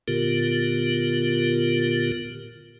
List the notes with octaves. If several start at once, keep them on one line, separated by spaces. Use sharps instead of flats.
A#2 D3 B3 F4 G4 A#4